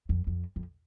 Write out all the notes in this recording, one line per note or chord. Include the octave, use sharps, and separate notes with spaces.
F2
F2
F2